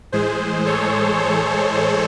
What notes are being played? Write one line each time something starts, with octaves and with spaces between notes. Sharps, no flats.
A2 E3 G#3 G#4 C5
A4 C#5
G#4 C5
G#4 C5